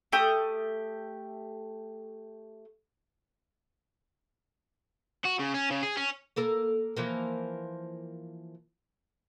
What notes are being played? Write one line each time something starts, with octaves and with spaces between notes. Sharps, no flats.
A3 G4 G5 D#6
F#4
C#3
C#4
C#3
G#4
C#4
A#3 A4 A#4
E3 F3 A#3